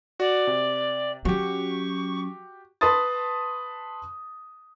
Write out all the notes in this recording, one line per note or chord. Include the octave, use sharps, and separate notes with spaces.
F#4 D5
C3
F#3 C#4 F#4 G4 C#6
B4 A5 B5 C6 D#6 A6